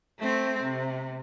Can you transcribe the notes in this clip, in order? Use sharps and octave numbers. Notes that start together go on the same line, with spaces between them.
A3 C4
C3